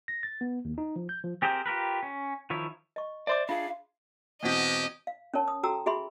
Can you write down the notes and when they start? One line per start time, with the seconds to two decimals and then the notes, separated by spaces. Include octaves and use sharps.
0.08 A#6
0.23 A6
0.41 B3
0.65 D#2
0.78 D#4
0.96 F3
1.09 G6
1.24 F3
1.42 C4 G4 G#4 A#4 C5
1.66 F4 G4 A#4 B4
2.03 C#4
2.50 D#3 F3 E4 C#5
2.96 D#5 C#6
3.27 C5 D5 E5 C6 D6
3.49 D4 F4 G#4 F5
4.43 E2 B2 G#3 C4 G4 D#5
5.07 F5
5.34 C#4 A#4 C#5 A5
5.48 D#6
5.63 F#4 A4 G5 A#5 E6
5.86 F#4 G#4 E5 B5 C6